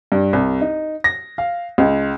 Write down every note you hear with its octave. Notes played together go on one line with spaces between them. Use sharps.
G2
C2
D#4
A#6
F5
C#2